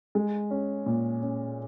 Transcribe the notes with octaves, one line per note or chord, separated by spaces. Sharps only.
G#3
C#4
A#2
C#4